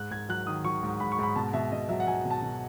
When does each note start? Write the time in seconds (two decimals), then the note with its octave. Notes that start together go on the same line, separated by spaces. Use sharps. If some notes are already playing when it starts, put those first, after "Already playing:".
Already playing: G#2 F#6
0.11 G#2 G#6
0.29 F#3 F#6
0.47 D#3 D#6
0.64 F#3 C#6
0.83 G#2
1.00 G#2 B5
1.12 C#6
1.19 G#2 B5
1.36 B2 A5
1.53 B2 E5
1.72 B2 D#5
1.89 F#3 E5
2.00 F#5
2.07 F#3 G#5
2.25 B2
2.31 A5
2.42 B2